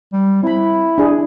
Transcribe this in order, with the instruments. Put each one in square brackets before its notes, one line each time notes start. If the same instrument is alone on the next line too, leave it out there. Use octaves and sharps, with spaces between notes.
[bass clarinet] G3
[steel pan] C4 B5 [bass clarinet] E4
[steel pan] D4 G#4